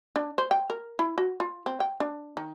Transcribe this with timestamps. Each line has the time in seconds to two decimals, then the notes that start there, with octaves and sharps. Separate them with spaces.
0.16 D4
0.38 C5
0.51 G5
0.70 A#4
0.99 E4
1.18 F#4
1.40 F4
1.66 C4
1.80 G5
2.00 D4
2.37 D#3